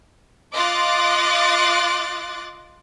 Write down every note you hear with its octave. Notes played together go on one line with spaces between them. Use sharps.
F4 D#5 C6 D6 F#6 A6